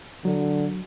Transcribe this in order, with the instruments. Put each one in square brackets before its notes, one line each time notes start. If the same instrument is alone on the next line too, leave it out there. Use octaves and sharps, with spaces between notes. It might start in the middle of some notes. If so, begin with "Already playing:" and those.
[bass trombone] D3 [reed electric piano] F#3